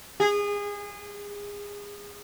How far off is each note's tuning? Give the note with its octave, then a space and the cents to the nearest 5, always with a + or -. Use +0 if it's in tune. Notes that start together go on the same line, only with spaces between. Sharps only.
G#4 -25